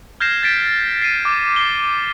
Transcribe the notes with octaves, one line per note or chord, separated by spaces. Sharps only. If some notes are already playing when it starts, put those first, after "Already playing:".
F6 G6 G#6 A#6 C7 E7
A6 B6 D7
C7 D#7
D6
C7 G7